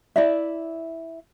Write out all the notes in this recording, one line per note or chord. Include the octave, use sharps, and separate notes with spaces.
E4 D5 E5